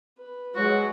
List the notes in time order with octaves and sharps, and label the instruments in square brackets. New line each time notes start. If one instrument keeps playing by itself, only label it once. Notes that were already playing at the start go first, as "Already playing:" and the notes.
[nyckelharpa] B4
[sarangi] F#3 [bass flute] G#3 [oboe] F#4